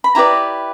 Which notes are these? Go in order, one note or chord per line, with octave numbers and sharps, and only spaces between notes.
B5
E4 G4 B4 D5 A#5